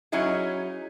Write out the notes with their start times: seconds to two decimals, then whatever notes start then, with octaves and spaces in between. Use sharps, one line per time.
0.12 F#3 C#4 D#4 E4 G#4